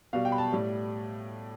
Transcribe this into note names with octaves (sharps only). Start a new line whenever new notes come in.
B2 G3 F5
G5
B5
A5
A2 G3